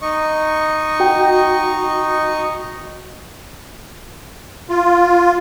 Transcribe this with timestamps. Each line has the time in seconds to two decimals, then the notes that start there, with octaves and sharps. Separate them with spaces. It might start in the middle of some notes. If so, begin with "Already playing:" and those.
0.02 D#4 D#5 C#6
1.00 F#4 G5
4.69 F4